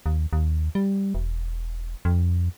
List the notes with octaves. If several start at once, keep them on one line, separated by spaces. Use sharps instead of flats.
D#2
D#2
G3
E1
F2